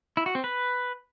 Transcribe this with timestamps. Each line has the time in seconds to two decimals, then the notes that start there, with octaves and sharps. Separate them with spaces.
0.17 E4
0.26 F#4
0.35 C4
0.44 B4